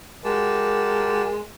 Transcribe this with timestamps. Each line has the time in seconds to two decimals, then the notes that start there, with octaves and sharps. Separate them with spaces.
0.25 G#3 F#4 G4 A#4 A5